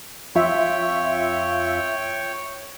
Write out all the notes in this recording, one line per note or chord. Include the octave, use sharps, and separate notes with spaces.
F2 F4 C#5 E5 G5